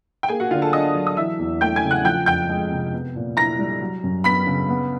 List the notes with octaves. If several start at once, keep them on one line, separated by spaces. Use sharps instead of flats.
G5
A#3 G#4 G#5
F#4 F#5
D3 F4 F5
A4 A5
D4 D#5 D#6
F#3
D#6
E3 E5 E6
E2
A3 G5 G6
G#5 G#6
C#3
F#5 F#6
F3 G5 G6
F2 G5 G6
G#3
C3
B3
A#2
E4 A#5 A#6
G3
F#3
F#2
B3 B5 B6
C#3
B3